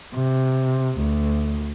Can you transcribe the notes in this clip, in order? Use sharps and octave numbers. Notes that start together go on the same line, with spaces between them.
C3
D2